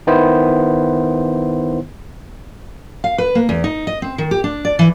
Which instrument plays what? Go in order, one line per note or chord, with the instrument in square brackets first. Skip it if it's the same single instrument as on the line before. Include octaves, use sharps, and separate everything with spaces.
[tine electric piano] D#3 B3 E4 C5
[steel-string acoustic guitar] F5
B4
A#3
E2
D#4
D#5
C4
D#3
G4
D4
D5
E3